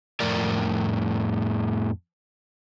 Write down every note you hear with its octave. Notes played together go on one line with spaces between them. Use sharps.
F2 A2 A#4 D5